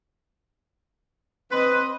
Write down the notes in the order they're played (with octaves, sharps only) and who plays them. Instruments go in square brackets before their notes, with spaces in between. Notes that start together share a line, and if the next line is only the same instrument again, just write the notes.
[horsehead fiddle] C4 D#5 [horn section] B4 [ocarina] C6